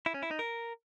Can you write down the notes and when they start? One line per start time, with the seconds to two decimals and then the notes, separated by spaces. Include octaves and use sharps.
0.06 E4
0.14 C#4
0.23 E4
0.31 D#4
0.39 A#4